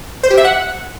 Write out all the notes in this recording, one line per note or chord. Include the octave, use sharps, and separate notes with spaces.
C5
G4
E5
F#5